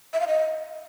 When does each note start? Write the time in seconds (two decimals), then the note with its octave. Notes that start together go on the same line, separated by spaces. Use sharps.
0.13 E5
0.21 F5
0.28 D#5